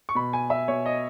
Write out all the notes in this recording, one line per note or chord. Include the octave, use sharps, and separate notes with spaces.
C#6
B2 B5
G#5
E5
B2 C#5
D#5